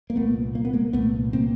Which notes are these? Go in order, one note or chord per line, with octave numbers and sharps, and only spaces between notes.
A#3
C2 A#2 A3 B3
A#3
B3
G#3 A#3
C2 A#2 A3 B3
A#3 C4